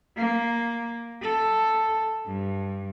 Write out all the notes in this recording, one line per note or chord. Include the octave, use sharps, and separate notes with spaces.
A#3
A4
G2